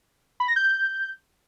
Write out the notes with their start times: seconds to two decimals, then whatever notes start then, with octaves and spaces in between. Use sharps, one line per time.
0.40 B5
0.48 A#6
0.56 G6